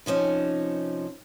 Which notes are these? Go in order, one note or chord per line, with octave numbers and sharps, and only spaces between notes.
C3 F3 C#4 D#4